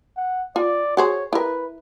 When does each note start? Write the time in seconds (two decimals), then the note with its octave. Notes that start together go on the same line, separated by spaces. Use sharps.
0.17 F#5
0.56 F4 D5
0.97 F#4 G#4 C5 C#5
1.33 E4 A#4 B4